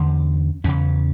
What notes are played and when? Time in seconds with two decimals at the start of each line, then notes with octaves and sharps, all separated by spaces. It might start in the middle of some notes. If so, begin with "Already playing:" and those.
Already playing: E2 D3 C#4
0.64 E2 C#3 C#4